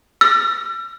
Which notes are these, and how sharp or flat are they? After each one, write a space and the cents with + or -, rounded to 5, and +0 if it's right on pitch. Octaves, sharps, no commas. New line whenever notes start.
E6 +40